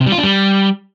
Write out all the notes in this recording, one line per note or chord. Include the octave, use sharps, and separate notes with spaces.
C3
G3
F4
D4
G3